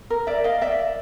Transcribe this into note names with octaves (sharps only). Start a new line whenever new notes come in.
A#4
D5 E5
D#5 F5
D5 E5